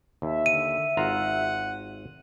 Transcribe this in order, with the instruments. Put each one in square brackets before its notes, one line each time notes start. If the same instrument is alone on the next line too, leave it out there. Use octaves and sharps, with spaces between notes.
[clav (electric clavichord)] D#2 [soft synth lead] E5
[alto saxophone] D3 [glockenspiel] D#7
[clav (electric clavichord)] G#1 F4 A#5 [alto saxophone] F#5